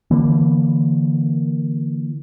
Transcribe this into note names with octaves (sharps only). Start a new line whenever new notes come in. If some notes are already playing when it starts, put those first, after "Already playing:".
D3 E3 A#3